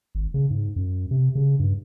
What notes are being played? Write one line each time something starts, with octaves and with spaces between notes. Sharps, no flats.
G#1
C#3
G#2
F#2
C3
C#3
G2